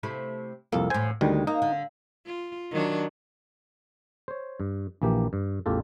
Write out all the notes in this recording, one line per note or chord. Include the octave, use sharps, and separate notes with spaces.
C3 A3 E4
C2 F2 A#3 A4
E2 A2 C5 G#5
D2 D#3 G3 G#3
A#3 D#4
D3
F4
D#3 F#3 D4
C5 C#5
G2
A#1 E3 A#3 G4
G2
A1 E2 F4 G4 A4